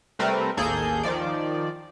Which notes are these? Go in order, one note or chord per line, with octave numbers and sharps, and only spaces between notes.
C3 G3 A3 C4 A#4 B4
A1 D#2 A#3 G#4 A4 G6
D#3 F3 D5